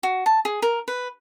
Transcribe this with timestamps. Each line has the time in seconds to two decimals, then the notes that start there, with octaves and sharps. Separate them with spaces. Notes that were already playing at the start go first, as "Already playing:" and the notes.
0.03 F#4
0.26 A5
0.45 G#4
0.62 A#4
0.88 B4